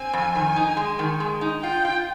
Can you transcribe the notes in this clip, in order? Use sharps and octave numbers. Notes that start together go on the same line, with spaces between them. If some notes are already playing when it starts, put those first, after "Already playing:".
Already playing: C4 G#5
F2
D#3
D#4
G#3
D#3
G#3
D#4
F4 G5
F4